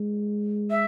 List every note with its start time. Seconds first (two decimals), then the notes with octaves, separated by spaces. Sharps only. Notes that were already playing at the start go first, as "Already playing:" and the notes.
Already playing: G#3
0.70 E5